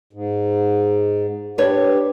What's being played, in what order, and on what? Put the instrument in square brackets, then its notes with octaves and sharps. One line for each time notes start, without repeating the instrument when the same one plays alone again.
[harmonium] G#2
[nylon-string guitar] D4 B4 C#5 [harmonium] G4